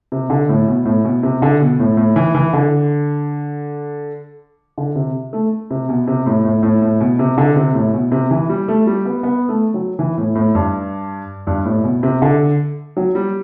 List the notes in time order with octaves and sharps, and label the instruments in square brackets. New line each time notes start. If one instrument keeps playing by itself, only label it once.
[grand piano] C3
D3
A2
B2
A2
B2
C3
D3
B2
A2
A2
E3
E3
D3
D3
C3
A3
C3
B2
C3
A2
A2
A2
A2
B2
C3
D3
C3
A2
B2
C3
E3
G3
A3
G3
B3
B3
A3
F#3
E3
A2
A2
G2
G2
A2
B2
C3
D3
F#3
G3